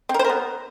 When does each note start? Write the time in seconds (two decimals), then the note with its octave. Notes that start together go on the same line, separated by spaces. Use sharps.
0.09 C4
0.14 A#4
0.19 C5
0.24 A#4
0.30 B3